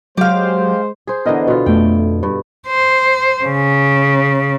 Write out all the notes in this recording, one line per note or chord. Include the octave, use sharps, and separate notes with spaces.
F#3 G#3 G4 C5 F5
G#4 C5
D3 E3 B3 A#4 D#5
B2 F4
F2 B2 A3 G5
G2
C5
C#3